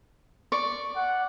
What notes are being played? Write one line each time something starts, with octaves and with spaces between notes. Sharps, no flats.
D5 C#6
F#5